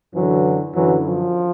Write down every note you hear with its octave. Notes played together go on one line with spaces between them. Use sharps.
F#2 D3 E3 F#3
F#2 D3 E3 F#3
F3